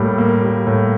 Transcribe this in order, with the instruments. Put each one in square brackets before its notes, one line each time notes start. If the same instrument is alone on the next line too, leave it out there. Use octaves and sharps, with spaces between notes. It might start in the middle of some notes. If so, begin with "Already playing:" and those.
Already playing: [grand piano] A2 G3 A#3
A#3
G3
A2